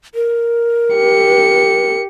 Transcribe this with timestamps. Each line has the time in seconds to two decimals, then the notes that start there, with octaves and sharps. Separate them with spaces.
0.15 A#4
0.95 G4 C#7